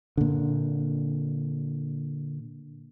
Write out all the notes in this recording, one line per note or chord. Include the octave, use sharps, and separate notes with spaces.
A#2 D3